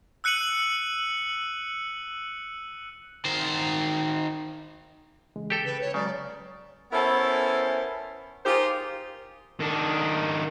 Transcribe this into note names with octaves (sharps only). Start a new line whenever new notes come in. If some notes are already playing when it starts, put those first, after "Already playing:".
E6 F#6 C#7 D#7 F#7
D#3 C5
C#3 E3 G#3
G4 A4 G5
C#3 B4
C#5
C#3 F#3 G#3 D5 A#5
B3 C#4 E4 A4 A#4 C5
D#4 F4 G4 G#4 A#4 C5
D#3 D4